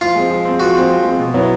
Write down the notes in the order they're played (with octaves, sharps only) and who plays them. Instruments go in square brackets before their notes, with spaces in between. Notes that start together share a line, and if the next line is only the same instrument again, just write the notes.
[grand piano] F3 [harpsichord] F4
[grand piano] G#3 C4
F3
G#3 C4
[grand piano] F3 [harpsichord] F#4
[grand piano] G#3 C4
F3
G#3 C4
B2
F#3 B3 E4